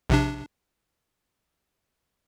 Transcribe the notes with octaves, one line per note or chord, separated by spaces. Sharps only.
A#1 C3 D4